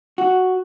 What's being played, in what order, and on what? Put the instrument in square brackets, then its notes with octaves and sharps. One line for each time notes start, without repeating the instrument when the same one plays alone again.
[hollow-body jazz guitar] F#4